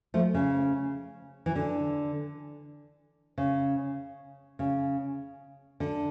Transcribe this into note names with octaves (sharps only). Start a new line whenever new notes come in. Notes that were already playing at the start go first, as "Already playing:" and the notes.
F3 A3
C#3
E3
D3
C#3
C#3
D3